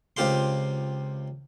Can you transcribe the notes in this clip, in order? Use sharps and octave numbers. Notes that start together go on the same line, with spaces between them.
C#2 C4 F4 G4 F5 C6